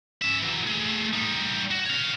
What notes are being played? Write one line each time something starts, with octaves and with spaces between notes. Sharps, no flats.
C#4 E5
E3 F#3
A3 G#4
G3 D#4
F#4
C#5 F5